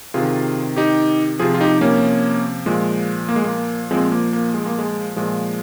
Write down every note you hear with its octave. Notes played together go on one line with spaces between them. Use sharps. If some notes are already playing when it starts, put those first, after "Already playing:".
C3 D#3 F4 G#4
D#4 G4
C3 F3 F4 G#4
F4
D#4 G4
A#3 C#4
A#2 F3 G#3
A#3
G#3
A#3
A#2 F3 G#3 C4
A#3
A#3
G#3
A#3
G#3
A#2 F3 G#3